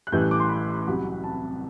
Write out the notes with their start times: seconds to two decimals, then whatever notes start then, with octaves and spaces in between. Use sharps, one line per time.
0.07 F#6
0.12 A1 A2 E3 G3 G6
0.22 F#6
0.31 D6
0.40 C6
0.49 B5
0.87 C2 C3 F#3
1.24 A5